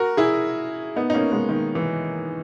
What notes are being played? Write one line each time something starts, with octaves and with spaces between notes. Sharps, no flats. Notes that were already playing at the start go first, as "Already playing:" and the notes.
Already playing: F#4 A#4
E4 G#4
B3 D#4
D#4
A#3 C#4
G#3 B3
D#3
E3